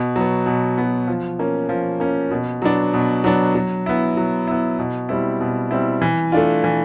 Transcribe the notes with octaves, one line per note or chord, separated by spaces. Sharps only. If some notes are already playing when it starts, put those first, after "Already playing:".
Already playing: B2
F#3 B3
B2
F#3 B3
F3
A#3 C#4
F3
A#3 C#4
B2
F#3 B3 D4
B2
F#3 B3 D4
F#3
B3 E4
F#3
B3 E4
B2
G3 C4 E4
B2
G3 C4 E4
E3
A3 D4 F4
E3